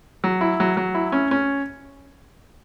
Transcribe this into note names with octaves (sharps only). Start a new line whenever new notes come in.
F#3
E4
F#3
F#3
E4
C#4
C#4